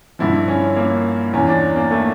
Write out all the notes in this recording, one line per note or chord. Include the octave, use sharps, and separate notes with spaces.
G2 D3 F3 E4
C#4
A#3
E2 E3 C#4
D4
A#3
A3